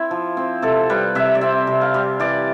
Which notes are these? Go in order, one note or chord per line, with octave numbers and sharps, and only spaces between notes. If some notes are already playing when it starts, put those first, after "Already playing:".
Already playing: C4 E4
F3
C4
C3 A4
G3 B4
C3 E5
D5
C4 E5
C3
F5
G3
E3 D5